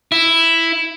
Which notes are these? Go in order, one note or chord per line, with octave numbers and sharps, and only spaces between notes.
E4